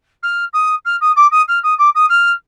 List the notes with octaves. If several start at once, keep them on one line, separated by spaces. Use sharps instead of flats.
F6
D#6
F6
D#6
D6
D#6
F6
D#6
D6
D#6
F6